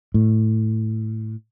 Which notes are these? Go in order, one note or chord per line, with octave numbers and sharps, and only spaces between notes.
A2